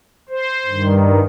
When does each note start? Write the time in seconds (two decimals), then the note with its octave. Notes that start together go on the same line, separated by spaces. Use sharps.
0.29 C5
0.66 G2 D#3